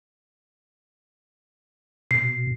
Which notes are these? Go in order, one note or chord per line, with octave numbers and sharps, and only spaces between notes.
B2 C7